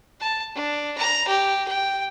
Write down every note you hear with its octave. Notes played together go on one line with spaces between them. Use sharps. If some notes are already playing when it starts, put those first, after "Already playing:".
A5
D4
A#5
G4
G5